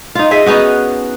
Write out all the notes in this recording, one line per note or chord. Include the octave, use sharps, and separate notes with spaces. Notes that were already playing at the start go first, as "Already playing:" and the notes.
D#4 F4
G#4 D#5 E5
B3 C#4 D#4 F#4